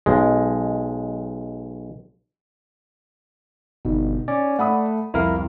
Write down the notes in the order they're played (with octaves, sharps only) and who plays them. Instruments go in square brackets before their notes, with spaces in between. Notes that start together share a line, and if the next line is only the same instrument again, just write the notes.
[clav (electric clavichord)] B1 G#3
[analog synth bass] G1 [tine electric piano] B2 [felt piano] D#4
[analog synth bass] C#4 [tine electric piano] D5
[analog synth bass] A3 [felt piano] F#5 B5 D#6
[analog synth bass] C2 [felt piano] F2 [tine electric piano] E4 A#4 F5